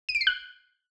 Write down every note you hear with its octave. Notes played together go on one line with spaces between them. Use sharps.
D#7
D7
C7
F#6